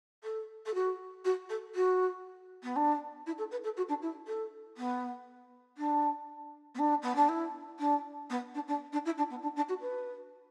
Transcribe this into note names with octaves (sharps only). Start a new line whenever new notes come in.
A4
A4
F#4
F#4
A4
F#4
B3
D4
E4
A4
B4
A4
F#4
D4
E4
A4
B3
D4
B3
D4
B3
D4
E4
D4
B3
D4
D4
D4
E4
D4
B3
D4
D4
F#4
B4